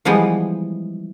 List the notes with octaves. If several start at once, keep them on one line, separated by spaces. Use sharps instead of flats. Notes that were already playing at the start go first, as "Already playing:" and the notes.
E3 F3 G3 G#3 B3